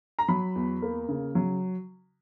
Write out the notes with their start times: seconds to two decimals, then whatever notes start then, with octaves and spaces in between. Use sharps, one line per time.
0.19 A#5
0.28 F#3 B5
0.55 E2
0.82 A#3
1.09 C#3
1.35 F#3